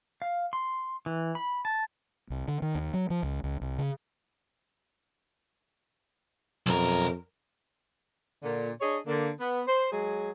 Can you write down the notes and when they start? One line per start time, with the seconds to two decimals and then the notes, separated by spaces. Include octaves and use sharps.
0.22 F5
0.53 C6
1.06 E3
1.35 B5
1.65 A5
2.30 C2
2.48 D3
2.62 D#3
2.75 D#2
2.94 F#3
3.10 F3
3.23 C#2
3.44 C#2
3.61 C2
3.78 C#3
6.66 B1 F2 A#4
8.42 A#2 D3
8.81 D4 G#4 C#5 D#5
9.07 D3 A#3
9.39 B3
9.66 C5
9.91 F#3 G#3 G#4